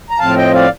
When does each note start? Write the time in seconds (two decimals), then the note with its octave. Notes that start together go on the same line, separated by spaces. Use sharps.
0.10 A#5
0.19 A2 F3 C4 F5 A5
0.36 D#5 G5
0.54 D5 F5